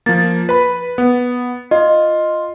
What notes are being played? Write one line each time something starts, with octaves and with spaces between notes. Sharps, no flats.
F3 A#3 A6
B4 B5
B3
F4 D#5